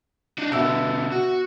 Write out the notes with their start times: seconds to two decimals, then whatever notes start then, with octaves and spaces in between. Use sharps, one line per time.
0.38 D4 D#4
0.52 B2 D3 B3 E5 E6
1.11 F#4